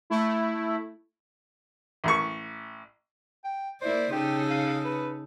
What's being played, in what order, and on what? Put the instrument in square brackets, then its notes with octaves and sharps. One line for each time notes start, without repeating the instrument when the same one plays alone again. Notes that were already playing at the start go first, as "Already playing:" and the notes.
[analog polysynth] A3 E4
[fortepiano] A1 C#6
[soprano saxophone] G5
[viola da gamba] A#3 E4 D5 [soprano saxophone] C5
[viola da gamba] C#3 D#4 A4 [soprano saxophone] G4
[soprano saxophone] F5
B4